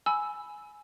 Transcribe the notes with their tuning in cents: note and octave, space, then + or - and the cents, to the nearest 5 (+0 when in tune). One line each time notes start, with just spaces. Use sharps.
G#5 +10 B5 +0 E6 +0